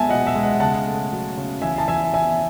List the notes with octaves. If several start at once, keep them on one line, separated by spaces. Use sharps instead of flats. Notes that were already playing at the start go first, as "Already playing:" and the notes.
Already playing: G#3 B3 E5 G#5 A5
B2 D#5 F#5
E5
G#3
D#5 F#5
C#3 F#5 A5
A3
F#3
C#3
E3 E5 G#5
A5
E3 E5 G#5
E3 E5 G#5